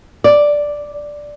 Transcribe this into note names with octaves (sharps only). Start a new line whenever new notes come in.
D5